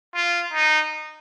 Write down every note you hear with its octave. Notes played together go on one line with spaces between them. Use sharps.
F4
D#4